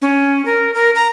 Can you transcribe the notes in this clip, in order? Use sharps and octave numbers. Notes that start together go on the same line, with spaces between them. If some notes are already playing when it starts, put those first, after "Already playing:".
C#4
A#4
A#4
A#5